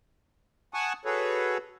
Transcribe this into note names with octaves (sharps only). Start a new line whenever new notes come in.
F#5 G#5 A5 C#6 D#6
F#4 G#4 A4 B4 C#5